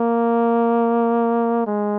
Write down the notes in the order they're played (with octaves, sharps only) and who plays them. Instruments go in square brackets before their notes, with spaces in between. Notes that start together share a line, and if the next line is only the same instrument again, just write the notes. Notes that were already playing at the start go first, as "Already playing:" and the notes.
Already playing: [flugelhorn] A#3
G#3